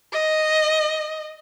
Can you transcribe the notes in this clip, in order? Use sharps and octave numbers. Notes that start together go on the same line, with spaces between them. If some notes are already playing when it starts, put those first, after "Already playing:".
D#5